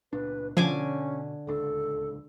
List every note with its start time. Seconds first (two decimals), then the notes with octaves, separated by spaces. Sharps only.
0.13 C#2 A#2 D4 B4
0.57 B2 D3 F3 C#4 G#5 D6
1.47 D1 C#2 D4 A4